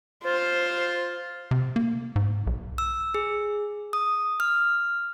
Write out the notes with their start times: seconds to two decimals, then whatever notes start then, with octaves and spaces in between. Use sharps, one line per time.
0.24 F4 C5
1.51 C3
1.76 A#3
2.16 G#2
2.47 B1
2.78 E6
3.14 G#4
3.93 D#6
4.40 F6